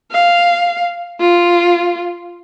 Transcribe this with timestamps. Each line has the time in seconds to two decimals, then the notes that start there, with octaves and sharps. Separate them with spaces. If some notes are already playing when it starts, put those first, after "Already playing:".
0.12 F5
1.20 F4